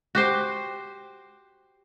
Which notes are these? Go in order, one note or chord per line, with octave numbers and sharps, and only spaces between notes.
F#4 G4 C5